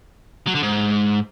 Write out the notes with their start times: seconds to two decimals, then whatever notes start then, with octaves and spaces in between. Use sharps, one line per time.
0.47 F#3
0.55 D3
0.63 G#2